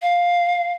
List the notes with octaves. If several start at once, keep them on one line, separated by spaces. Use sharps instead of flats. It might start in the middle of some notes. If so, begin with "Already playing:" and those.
F5